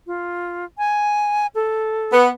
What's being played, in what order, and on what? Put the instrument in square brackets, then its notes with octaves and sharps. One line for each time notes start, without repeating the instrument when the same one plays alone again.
[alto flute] F4
G#5
A4
[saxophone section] B3